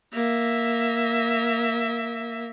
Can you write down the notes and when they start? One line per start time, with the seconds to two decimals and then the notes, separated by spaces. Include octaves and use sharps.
0.13 A#3 E5